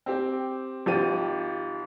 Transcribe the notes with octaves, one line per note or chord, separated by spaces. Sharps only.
C4 G4
G#1 F3 G4 D#7